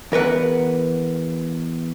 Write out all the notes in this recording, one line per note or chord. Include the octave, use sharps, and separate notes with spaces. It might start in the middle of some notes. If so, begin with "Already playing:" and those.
E2 A#4 B4 F#5